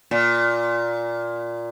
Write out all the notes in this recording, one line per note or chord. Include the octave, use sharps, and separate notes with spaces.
A#2